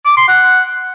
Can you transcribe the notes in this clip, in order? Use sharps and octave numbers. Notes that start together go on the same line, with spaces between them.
D6
C6
F#5